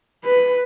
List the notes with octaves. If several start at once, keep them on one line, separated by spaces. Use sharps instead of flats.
B4